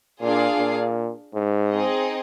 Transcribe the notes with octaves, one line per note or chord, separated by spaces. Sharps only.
A#2 D4 F4 G#4 D5 F5
A#2
G#2
C4 D#4 G#4 D#5